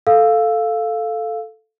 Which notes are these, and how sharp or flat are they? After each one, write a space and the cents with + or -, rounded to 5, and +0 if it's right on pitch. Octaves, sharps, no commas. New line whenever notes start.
A4 +0 F5 +0 E6 +0